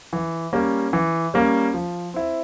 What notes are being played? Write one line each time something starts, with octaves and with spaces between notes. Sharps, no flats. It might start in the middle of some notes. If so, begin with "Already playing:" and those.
E3
G3 A#3 C#4
E3
G3 A#3 C#4
F3
C4 E4